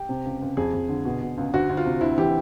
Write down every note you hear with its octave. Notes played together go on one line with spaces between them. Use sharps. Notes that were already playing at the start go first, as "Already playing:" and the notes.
Already playing: G4
C3
C#2
C#2
F2 G#4
F2
D3
B2
B2
C#2
D2 F#4
D2
F4
C3
D2 E4
E3 G4